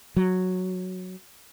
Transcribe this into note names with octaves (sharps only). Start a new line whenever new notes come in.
F#3